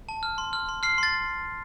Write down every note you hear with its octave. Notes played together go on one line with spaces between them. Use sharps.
A5
F6
C6
F6
C6
F6 C7
C6 A6